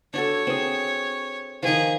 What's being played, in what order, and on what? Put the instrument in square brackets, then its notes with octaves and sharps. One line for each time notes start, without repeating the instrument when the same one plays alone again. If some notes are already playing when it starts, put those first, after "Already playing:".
[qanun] D4 F#4 A4 [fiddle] C#5
[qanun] C4 G#4
[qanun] D#3 F3 [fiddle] G#4